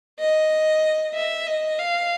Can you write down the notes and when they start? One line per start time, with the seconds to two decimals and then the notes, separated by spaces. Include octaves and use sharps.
0.19 D#5
1.15 E5
1.47 D#5
1.79 F5